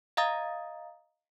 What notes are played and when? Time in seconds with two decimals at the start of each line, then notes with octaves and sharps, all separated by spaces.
0.17 D#5 F5 A#5 D#6 A6